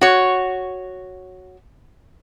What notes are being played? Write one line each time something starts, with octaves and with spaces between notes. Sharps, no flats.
F#4 C#5